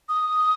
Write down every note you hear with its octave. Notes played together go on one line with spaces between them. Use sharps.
D#6